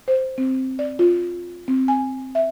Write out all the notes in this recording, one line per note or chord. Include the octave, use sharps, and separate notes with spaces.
C5
C4
D5
F4
C4
G#5
E5